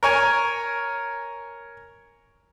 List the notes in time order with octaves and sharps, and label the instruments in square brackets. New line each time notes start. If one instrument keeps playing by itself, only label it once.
[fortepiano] A#4 C#5 G#5